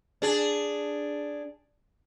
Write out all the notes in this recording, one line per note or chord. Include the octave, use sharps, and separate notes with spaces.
D4 G#4